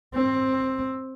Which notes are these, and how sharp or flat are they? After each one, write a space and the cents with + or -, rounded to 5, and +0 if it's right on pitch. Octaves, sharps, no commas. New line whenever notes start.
C4 +10